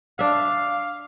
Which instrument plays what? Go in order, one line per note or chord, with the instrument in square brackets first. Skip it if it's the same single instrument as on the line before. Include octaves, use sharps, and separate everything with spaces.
[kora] D4 E5 [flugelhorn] F5